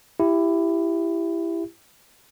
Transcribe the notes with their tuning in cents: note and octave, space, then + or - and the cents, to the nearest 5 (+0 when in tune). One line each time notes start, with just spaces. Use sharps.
E4 +15 G4 +5